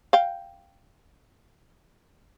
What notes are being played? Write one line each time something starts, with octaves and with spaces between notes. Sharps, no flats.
F5 G5